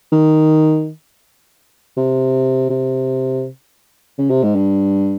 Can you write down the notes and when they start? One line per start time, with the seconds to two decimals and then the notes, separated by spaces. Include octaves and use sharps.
0.12 D#3
1.97 C3
2.70 C3
4.18 C#3
4.30 C3
4.43 G#2
4.55 G2